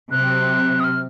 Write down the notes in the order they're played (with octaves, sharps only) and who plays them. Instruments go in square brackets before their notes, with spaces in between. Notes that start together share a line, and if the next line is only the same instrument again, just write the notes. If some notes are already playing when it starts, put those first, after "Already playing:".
[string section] C3 F#3 C4 [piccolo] F#6
[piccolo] D#6
F6